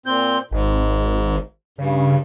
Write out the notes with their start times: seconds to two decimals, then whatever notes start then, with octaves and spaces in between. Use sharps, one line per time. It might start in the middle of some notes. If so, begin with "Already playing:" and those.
0.06 A#2 C4 G6
0.51 G#1 G#2
1.78 G2 C#3